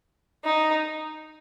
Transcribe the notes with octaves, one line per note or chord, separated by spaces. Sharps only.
D#4